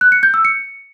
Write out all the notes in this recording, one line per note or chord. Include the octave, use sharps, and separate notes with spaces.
F#6
C#7
G6
E6
C#7